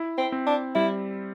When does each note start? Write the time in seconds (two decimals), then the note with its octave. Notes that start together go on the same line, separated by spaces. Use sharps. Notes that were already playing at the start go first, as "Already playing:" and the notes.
Already playing: E4
0.18 C4
0.32 C4
0.47 D4
0.75 G3 E4